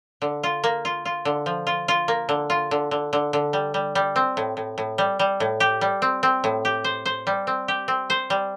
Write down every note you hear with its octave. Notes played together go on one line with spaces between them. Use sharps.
D3
F4
A#3
F4
F4
D3
F3
F4
F4
A#3
D3
F4
D3
D3
D3
D3
G3
G3
G3
C4
A2
A2
A2
G3
G3
A2
G4
G3
C4
C4
A2
G4
C5
C5
G3
C4
G4
C4
C5
G3